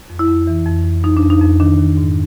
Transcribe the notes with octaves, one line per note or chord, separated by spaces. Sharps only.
F2
E4
F2
E3
F2
F2
F2 D#4
D4
F2
D#4
F2
D#3 D4
D#3
G#2